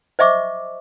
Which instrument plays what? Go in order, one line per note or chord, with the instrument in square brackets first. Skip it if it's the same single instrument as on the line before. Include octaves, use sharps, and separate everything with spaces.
[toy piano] C5 D#5 E5 C#6 D6